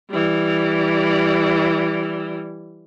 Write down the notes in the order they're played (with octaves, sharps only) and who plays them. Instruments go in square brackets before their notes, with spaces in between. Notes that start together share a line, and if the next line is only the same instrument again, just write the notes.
[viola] E3 G3